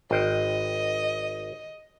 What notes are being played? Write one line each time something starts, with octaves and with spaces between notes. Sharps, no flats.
G#1 C5 D#5 G5